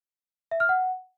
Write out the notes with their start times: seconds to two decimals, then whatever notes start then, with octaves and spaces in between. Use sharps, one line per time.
0.51 E5
0.60 F6
0.69 F#5